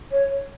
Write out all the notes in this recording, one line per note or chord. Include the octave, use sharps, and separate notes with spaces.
C#5